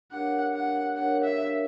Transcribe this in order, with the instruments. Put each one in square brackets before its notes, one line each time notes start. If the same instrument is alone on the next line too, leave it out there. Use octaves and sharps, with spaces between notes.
[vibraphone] D4 G4 A#4 C#5 F5 [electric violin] F#5
[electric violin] F#5
[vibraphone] D4 G4 A#4 C#5 F5 [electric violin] F#5
[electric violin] E5